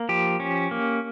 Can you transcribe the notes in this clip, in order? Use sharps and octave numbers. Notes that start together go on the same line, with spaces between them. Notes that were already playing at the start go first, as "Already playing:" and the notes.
Already playing: A#3
F3 G4
C#4
A#3